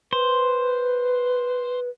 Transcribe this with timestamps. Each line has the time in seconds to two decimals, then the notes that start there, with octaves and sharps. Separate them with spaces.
0.13 B4 C5